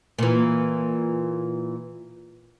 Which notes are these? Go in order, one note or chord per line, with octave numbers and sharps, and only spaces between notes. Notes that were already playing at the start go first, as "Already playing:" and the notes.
A#2 E3